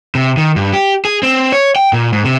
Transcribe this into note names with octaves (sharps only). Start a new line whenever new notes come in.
C3
D#3
G2
G4
G#4
C4
C#5
G5
A#2
G#2
C3